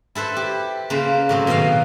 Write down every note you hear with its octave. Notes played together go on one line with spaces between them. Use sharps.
E4 A4 B4 C5
G4
C#3 A#3 B4 C5
A2 F#3 C4
B2 D#3 A#3 D#5 F5